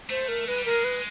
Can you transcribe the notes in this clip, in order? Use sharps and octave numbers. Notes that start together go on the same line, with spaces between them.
A3 C5
A#4
G#3 B4
G3
G#3 A#4
B4